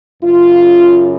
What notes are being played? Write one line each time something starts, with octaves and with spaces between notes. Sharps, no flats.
F#2 C#3 F4